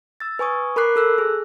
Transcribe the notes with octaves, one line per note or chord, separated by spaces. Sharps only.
E6 A6
B4 G#5 C#6 D#6
A#4 B5 D6 F#6 C7
A4 E6 F#6
G#4